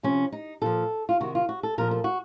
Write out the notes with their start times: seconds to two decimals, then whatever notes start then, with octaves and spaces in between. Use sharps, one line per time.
0.03 C3 F3 C#4
0.32 D#4
0.62 A#2 F3 A4
1.09 F4
1.20 C3 D#3 F#4
1.35 F4
1.49 F#4
1.63 A4
1.78 A#2 F3 A#4
1.91 A4
2.04 F#4